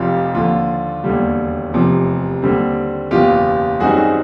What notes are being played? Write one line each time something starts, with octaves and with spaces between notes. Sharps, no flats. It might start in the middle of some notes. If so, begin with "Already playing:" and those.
Already playing: F1 F2 C3 F4 G4
D#2 D3 F3 F4
E1 D#2 D3 G3
F1 E2 C3 F3
D#2 D3 G3 C4
F#1 E2 B2 F4 G4
F#2 D#3 G3 C4 D#4 F#4 G#4
F#4 G#4